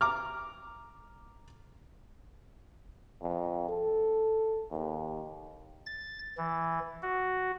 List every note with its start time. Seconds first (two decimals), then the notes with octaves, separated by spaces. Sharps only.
0.01 A#5 D6 F6
3.22 F2
3.69 A4
4.71 D#2
5.86 A6
6.38 E3
7.03 F#4